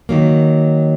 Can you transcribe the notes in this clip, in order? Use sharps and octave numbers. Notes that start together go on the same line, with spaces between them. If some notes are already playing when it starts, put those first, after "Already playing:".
D#3 F#3 A#3